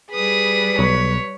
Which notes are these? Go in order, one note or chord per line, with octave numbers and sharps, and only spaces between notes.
G3 G#4 B4 D#6
B1 C#5